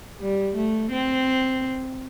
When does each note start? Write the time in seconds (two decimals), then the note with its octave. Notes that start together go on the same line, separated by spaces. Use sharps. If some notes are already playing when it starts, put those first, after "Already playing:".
0.20 G3
0.56 A3
0.91 C4